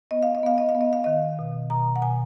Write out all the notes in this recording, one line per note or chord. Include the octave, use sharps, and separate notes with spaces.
B3 D#5
F5
D#5
B3 F5
D#5
F5
B3
D#5
F5
D#3 D#5
B2
B2 A#5
F#5
B2 G#5